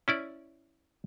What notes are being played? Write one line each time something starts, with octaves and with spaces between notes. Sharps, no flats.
C#4 E4 D5